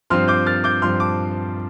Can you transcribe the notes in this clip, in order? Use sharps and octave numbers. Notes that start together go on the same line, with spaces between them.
G2 F3 C4 C6 F6
D6 G6
F6 A6
D6 G6
G2 F3 C4 C6 F6
A5 D6